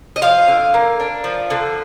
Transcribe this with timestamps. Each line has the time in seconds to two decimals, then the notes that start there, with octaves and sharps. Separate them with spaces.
0.16 D#5
0.22 F3 F5
0.48 D3
0.74 A#3
1.00 D4
1.24 F3
1.50 D3